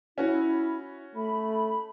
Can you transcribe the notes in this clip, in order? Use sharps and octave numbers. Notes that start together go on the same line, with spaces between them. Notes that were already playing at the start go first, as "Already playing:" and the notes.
C#4 E4 F#4 C#5
A3 B5